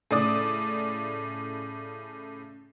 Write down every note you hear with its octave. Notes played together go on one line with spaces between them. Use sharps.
A2 C#3 D5 D#6